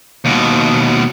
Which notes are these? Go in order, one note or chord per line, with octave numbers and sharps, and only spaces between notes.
D#2 B2